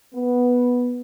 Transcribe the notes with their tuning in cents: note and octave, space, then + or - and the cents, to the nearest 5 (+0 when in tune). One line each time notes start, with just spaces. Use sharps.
B3 -5